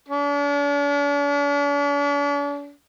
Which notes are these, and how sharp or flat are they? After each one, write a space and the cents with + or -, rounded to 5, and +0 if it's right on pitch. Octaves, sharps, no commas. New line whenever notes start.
D4 -45